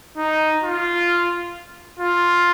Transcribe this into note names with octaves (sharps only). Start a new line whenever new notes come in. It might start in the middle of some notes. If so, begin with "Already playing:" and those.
D#4
F4
F4